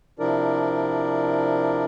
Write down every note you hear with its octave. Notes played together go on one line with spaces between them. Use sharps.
C3 F3 D4 E4 A#4 D5